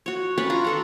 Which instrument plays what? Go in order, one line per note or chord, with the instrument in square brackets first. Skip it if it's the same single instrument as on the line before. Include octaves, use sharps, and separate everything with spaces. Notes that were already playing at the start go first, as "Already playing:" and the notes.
[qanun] F#4 C#5
C#4 B4 C#5 D5
D4 F4 A#5
F#4 A4 A#5